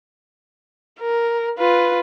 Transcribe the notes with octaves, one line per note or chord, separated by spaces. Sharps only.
A#4
F4 B4